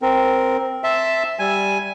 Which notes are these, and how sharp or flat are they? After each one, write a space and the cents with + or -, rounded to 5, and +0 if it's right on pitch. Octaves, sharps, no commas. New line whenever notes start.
C4 +0 A#4 +0
E5 +0 A5 +0 C6 +0
G3 +0 G#5 +0